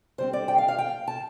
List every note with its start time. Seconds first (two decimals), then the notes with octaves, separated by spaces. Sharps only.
0.18 D3 G3 C4 C5
0.33 D5
0.48 G5
0.58 F5
0.68 F5
0.78 G5
1.08 A5